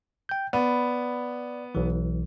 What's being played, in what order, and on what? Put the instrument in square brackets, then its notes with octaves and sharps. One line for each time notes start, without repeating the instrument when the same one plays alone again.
[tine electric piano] G5 G6
[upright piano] B3 [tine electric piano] D5
[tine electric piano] B1 E3